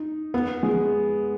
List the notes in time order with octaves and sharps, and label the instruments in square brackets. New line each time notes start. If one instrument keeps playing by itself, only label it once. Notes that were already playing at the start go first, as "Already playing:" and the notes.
Already playing: [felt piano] D#4
B3
G#3